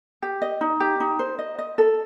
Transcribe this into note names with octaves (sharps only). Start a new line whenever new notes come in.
G4
D#5
D#4
G4
D#4
C5
D#5
D#5
A4